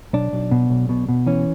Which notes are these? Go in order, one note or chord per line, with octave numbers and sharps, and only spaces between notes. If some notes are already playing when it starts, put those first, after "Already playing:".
B1 D4
B1
B2
B1
B2
B2
E3 C#4